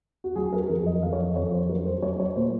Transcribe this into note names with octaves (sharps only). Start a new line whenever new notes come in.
F#4
F#3 G#4
A#4
F2 A#4
D#5
F2 F5
C#5
D#5
F2 C#5
C5
F#3 A#4
C5
F#3 C#5
C#5
A#2 C5